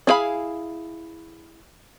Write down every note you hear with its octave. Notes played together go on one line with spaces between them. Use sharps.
D4 E4 G#4 F5 B5